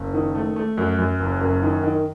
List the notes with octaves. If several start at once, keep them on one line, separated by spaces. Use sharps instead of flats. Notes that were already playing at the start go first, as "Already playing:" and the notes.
Already playing: F#1
D#3
A3
A3
F#2
F#2
F#1
F#2
D#3
D#3